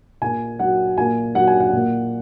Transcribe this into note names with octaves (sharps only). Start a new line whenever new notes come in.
A#2 G#5
F#3 F#5
A#2 G#5
F#3 F#5
G#5
F#5
A#2